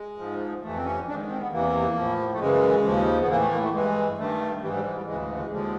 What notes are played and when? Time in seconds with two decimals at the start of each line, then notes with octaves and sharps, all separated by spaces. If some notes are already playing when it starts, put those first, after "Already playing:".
Already playing: G#3
0.18 G#2 F3
0.62 F2 C3 E3 A3
0.76 C4
0.84 C#4
1.06 G#2 D4
1.11 D#3
1.30 C4
1.40 B3
1.52 E2 C3 E3 A#3
1.95 A2 F3
2.33 A3
2.39 F#2 C#3 E3 G#3
2.84 D#2 C#3 F3
3.20 B3
3.29 E3 A#3
3.32 A2
3.40 A3
3.51 A#3
3.62 A3
3.73 G2 E3 G#3
4.17 G2 D#3 A3
4.61 G#2 E3 G3
4.73 G3
4.84 G#3
4.94 G3
5.05 D2 C#3 E3 G#3
5.21 G#3
5.36 G#3
5.51 D#2 D3 F3 G#3